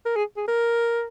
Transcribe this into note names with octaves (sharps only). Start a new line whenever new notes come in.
A#4
G#4
G#4
A#4